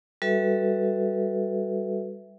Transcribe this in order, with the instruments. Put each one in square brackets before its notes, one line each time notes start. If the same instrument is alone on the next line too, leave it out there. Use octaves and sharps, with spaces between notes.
[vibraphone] G3 F#4 A4 B4 E5